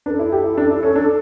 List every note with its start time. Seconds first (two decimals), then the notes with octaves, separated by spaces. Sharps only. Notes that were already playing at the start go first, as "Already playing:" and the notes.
0.06 D4 B4
0.10 A4
0.19 E4
0.32 G4
0.44 E4
0.58 D4
0.70 E4
0.83 C#4
0.96 D4